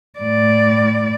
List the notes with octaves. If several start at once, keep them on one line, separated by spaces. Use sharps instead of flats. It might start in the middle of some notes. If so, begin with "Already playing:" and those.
A2 D5